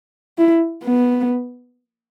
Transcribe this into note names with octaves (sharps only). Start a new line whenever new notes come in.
E4
B3